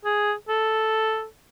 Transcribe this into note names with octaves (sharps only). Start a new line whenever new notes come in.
G#4
A4